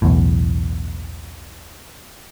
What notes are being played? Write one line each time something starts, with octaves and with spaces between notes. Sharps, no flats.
B1 E2 A2